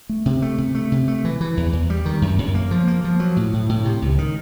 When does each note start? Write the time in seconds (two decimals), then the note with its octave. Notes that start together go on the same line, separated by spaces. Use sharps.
0.09 A3
0.26 C3
0.42 A3
0.58 C3
0.75 A3
0.92 C3
1.08 A3
1.25 E3
1.41 E3
1.57 E2
1.73 E2
1.90 G3
2.05 D#3
2.22 F#2
2.38 F#2
2.55 A#3
2.71 F3
2.88 A#3
3.04 F3
3.20 F#3
3.36 A2
3.53 A2
3.69 A2
3.85 C3
4.02 C#2
4.18 D#3